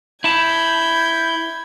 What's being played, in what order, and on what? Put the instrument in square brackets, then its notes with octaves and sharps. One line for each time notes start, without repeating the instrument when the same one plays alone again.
[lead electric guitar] E4 A5 [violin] B5 G#6 [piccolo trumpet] G6